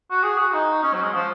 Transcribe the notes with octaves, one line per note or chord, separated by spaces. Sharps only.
F#4
G#4
F#4
D#4
C#4
F#3
G#3
F3